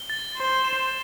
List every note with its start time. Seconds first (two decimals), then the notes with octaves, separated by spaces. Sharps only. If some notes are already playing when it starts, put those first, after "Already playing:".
Already playing: G7
0.10 A6
0.37 C5 G7
0.64 E7